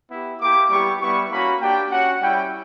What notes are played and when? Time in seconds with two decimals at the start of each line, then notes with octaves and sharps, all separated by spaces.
0.10 B3 E4 G4
0.40 A#3 E4 G4 D6
0.70 G3 B3 E4 G4 C#6
1.01 G3 B3 E4 C#6
1.31 A#3 C#4 F#4 B5
1.60 A#3 D4 G4 G5
1.92 C#4 F#4 F#5
2.22 G3 C#4 E4 G5